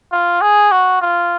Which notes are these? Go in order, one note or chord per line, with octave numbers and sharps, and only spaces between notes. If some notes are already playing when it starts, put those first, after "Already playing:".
F4
G#4
F#4
F4